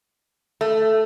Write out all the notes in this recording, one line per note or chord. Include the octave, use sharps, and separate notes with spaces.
A3